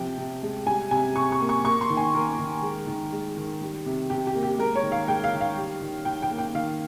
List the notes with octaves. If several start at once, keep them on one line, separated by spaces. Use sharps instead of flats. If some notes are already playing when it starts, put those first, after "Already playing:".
Already playing: C3 F3 G5
C3
G#3
G3 G#5
C3 G#5
C3 C#6
C#6
A#3
C#6
A#3 C#6
C6
D#3
G#5
A#3 A#4
D#3
G#3
D#3
G#3
D#3
G3
C3
C3 G4
G4
A#3
G4
G#3 A#4
C#5
D#3
F5
G#3 G5
F5
D#3
F5
G3
D#3
D#3 G5
G5
A#3
G5
D#3 F5